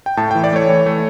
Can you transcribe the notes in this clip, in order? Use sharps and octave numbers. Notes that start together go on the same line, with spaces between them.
G5
A2 A5
G5
E3
D5
A3 C#5
E3
A3